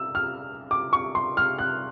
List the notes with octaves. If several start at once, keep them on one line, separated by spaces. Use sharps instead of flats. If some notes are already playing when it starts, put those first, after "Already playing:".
Already playing: E6
F6
D6
C#6
C6
F6
F#6